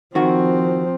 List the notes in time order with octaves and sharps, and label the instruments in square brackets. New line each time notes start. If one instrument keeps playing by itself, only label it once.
[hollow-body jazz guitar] D#3 F#4 [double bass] F3 C4